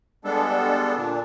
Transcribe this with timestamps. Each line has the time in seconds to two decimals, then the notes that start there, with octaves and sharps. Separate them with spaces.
0.25 G3 G#3 B3 D4 A4
0.97 A#2 D3 D4